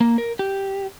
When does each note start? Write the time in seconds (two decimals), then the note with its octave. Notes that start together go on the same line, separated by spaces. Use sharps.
0.01 A#3
0.18 A#4
0.39 G4